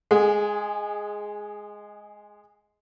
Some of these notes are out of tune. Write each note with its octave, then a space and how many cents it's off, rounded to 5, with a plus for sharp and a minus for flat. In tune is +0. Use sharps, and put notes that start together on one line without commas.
G#3 +0 G#4 -25 F#5 -30